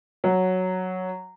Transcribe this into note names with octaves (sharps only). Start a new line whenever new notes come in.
F#3